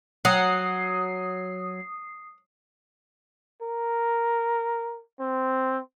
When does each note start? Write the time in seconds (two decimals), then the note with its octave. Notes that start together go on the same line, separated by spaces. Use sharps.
0.25 F#3 F#5 D#6 C7
3.62 A#4
5.19 C4